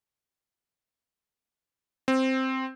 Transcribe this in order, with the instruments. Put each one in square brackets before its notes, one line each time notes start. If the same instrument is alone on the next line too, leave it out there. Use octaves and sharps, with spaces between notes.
[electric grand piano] C4